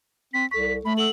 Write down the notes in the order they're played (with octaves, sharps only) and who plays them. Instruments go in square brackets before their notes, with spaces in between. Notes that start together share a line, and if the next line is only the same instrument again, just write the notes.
[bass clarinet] C4 [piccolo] B6
[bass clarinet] C2 [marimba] A4 C#6 [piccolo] B6
[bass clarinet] A3 [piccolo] B5
[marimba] A4 F#5 E6 [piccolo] F#7